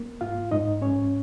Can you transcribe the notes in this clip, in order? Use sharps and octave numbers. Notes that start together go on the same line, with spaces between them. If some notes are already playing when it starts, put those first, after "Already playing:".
Already playing: A#3
G#2 F4 F5
G#2 D#4 D#5
G#2 C#4 C#5